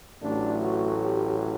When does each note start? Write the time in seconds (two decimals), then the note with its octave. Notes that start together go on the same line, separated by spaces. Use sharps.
0.21 A1 A2 F#3 A3 D4
0.61 F#4
1.02 G4